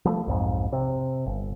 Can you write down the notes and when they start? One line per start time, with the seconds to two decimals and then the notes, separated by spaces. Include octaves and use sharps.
0.05 F3 G3 A3
0.27 B1 F2 G#2
0.73 C3
1.26 G1